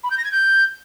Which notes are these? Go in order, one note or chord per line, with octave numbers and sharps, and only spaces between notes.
B5
G6
A#6
G#6
G6